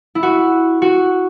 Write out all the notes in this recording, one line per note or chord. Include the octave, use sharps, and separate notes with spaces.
E4
F#4
F#4